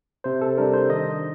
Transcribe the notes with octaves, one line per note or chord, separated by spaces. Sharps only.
C3 C5
A4
G3 D4 A#4
C5
D#3 D#5